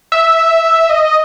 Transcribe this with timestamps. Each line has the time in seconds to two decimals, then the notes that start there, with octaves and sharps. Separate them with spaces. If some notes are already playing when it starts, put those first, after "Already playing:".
0.12 E5
0.89 D#5